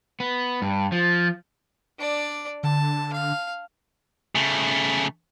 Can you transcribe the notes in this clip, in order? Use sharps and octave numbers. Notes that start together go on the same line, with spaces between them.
B3
G2
F3
D4 D5
D3 A5
F5
C#3 A3